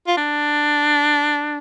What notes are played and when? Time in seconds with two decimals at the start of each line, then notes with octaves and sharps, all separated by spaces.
0.08 F4
0.17 D4